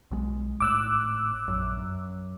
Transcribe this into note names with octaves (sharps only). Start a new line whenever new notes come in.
B1 F#3 G#3
G#1 A2 D6 E6 F#6
A#1 F#2
F#2